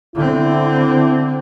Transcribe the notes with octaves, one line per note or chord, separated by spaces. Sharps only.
D3 C4 E4